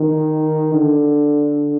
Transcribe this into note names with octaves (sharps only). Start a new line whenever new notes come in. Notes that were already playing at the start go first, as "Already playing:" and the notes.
Already playing: D#3
D3